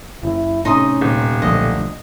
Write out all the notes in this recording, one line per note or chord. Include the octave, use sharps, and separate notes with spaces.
F#1 E4
A2 C3 C#4 D#4 C6 D#6
D#1
B1 D3 F3 A3 D#5